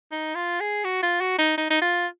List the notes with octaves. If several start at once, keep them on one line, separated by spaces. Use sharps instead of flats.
D#4
F4
G#4
F#4
F4
F#4
D#4
D#4
D#4
F4